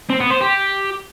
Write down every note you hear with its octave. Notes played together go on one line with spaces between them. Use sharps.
C4
B3
C5
G4